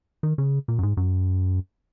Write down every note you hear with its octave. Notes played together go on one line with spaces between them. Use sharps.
D#3
C#3
A#2
F#2
G#2
F#2